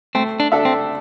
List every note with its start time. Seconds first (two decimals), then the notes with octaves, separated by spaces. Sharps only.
0.15 A3 C4
0.40 D4
0.52 D4 A4 E5
0.65 C4